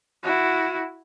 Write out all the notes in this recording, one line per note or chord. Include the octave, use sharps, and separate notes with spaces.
E4 F#4